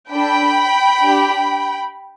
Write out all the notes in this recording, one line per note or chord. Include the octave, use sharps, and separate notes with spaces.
D4 A4 G5 B5
D4 G4